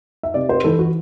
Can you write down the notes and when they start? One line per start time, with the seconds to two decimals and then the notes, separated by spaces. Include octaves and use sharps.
0.23 E5
0.34 C3 D5
0.49 C5
0.64 E3 A4
0.79 F#4